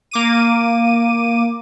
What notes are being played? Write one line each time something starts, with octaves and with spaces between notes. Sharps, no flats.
A#3 D6 D#7